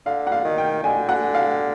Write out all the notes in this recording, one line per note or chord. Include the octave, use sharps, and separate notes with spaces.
D3 F5
F#5
F5
D#3
G5
D3 G#5
F#5
F5